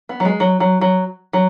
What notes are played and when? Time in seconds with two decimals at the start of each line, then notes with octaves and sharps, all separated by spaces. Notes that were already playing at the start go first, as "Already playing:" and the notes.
0.09 B3
0.20 F#3
0.25 G#3
0.40 F#3
0.60 F#3
0.81 F#3
1.33 F#3